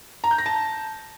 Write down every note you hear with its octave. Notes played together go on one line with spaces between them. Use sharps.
A#5
G6
A#6
A5